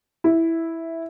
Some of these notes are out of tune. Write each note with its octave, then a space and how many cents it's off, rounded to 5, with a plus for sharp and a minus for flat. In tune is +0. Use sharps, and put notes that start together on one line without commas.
E4 -5